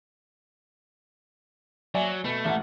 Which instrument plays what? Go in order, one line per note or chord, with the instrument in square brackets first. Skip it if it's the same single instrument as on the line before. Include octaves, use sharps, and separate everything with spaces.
[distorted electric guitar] F#3 [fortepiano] D5 E5 G#5
[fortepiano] B2 [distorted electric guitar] A3
[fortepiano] A1 F#5